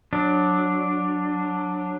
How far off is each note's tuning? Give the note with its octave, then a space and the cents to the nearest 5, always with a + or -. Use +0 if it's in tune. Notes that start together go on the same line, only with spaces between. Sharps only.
F#3 -20 D4 +0